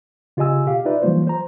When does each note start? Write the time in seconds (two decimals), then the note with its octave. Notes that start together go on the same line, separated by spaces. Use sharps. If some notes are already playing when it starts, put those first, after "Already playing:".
0.37 C#3 F4 G4 D#5 G#5 E6
0.66 B2 G4 F5
0.85 D#4 F4 B4 D5 E5
1.02 E3 F#3 G3 A#3 F4 C5
1.27 C5 A#5